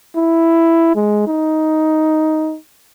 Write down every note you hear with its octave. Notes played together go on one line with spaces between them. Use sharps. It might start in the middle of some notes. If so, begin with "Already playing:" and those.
E4
G#3
D#4